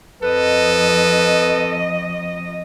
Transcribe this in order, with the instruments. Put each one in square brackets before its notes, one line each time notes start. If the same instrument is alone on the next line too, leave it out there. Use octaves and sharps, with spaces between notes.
[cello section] F2 D#5 [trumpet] A4 [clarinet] B4